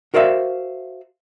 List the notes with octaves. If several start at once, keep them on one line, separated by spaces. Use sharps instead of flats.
F#4 A#4 C5 D5 E5 F5